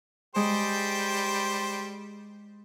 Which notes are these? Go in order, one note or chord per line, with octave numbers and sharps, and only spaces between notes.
G3 G#3 C5 G5